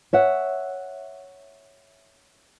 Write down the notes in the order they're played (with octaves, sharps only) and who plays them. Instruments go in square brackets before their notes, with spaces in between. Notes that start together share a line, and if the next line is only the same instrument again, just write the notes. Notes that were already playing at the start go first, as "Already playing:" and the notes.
[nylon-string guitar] C#5 E5 F#5